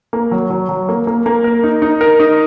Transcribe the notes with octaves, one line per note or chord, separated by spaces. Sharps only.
A#3
F#3
F#3
F#3
A#3
A#3
A#3
A#4
D#4
D#4
A#4
D#4